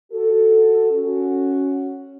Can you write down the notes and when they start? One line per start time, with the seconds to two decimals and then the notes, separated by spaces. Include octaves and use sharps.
0.12 F#4 A4
0.90 C#4 F#4